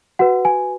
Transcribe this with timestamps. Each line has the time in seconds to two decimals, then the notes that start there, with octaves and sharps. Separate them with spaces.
0.19 F#4 B4 F#5
0.45 G#5